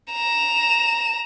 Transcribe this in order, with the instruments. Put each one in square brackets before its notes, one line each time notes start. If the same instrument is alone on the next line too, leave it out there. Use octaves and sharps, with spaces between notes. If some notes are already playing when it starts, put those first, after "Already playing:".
[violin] A#5 E7